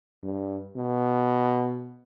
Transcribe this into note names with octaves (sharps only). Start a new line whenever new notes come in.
G2
B2